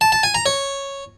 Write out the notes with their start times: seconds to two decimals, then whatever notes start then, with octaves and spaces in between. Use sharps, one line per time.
0.01 A5
0.12 A5
0.23 G#5
0.35 A#5
0.46 C#5